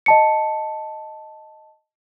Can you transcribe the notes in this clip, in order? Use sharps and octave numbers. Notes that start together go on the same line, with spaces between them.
D#5 A5 C#7